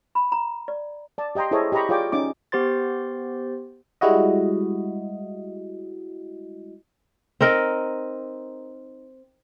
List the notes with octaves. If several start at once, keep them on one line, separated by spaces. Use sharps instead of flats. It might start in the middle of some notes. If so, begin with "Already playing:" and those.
B5
A#5
D5
D5 A5
G4 D#5 G5 A#5 C6
E4 G#4 A4 C5 C#5 D#5
G4 D#5 G5 A#5 B5 C#6
F4 G#4 C#5 D5 G5 D6
C#4 D#4 D6
B3 G4 C5 C6 A6
G3 G#3 E4 F#4 D#5
C4 D#4 A#4 D#5